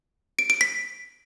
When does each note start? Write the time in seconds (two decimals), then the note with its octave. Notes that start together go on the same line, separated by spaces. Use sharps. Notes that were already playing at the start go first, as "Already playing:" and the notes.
0.39 D7
0.50 D7
0.61 B6